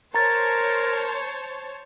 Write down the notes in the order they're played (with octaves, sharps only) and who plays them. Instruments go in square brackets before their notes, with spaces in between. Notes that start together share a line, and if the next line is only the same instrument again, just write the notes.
[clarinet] A#4 [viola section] C5 C#5 A5 [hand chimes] A#5 A6